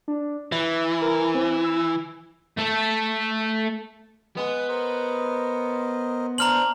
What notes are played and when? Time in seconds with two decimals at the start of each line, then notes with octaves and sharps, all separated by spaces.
0.08 D4
0.52 E3 E4
1.02 A#4
1.34 C4
1.64 E6
2.58 A3 A4
4.37 G#3 B3 D#6
4.69 A#4 C5 D#5
6.38 D4 C5 A#5 F6 F#7